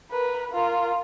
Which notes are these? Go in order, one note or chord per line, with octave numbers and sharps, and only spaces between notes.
A#4 B4
F4 A#4